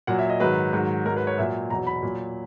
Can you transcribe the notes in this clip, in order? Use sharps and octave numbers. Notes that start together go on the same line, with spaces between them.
A#2 F#3 F#5
E5
D#5
G#2 D#3 F#3 B4
G#2 D#3 F#3
G#2 F#3 A#4
B4
C#5
A#2 F#3 E5
E2 B2 F#3 A#5
B5
A#2 F#3